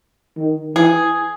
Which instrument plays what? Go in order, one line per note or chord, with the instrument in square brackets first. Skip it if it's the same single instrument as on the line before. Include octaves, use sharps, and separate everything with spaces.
[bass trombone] D#3
[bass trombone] E3 [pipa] G#4